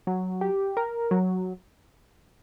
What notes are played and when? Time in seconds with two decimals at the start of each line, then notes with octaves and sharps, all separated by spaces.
0.07 F#3
0.41 G4
0.77 A#4
1.11 F#3